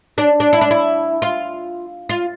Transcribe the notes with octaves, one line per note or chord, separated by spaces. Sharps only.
D4
D4
E4
D4
E4
F4
F4